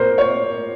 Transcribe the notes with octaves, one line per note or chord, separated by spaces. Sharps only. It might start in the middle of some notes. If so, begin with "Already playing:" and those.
Already playing: A#2 A#4 C5
C#5